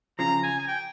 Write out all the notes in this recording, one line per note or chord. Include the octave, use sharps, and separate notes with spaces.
C#3 F3 A#5
G#5
G#5
G5